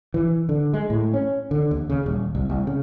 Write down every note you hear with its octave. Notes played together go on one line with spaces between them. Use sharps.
E3
D3
G#3
A2
C#4
D3
D#2
C#3
D#1
C2
C2
C#3